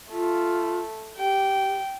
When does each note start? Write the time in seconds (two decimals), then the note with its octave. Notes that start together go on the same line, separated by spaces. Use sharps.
0.11 A3 F4
1.17 G4 G5